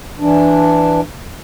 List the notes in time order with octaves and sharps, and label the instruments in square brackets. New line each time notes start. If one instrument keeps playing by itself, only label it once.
[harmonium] E3 D4